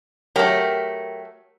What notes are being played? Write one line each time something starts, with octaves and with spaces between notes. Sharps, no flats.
F#3 A3 G4 A#4 G5